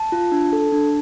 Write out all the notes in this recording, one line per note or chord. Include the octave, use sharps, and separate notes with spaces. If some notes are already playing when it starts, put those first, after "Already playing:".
Already playing: A5
F4
D4
A4
D4